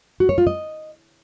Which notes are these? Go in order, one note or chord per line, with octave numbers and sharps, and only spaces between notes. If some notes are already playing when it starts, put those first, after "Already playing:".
F#4
C#5
F4
D#5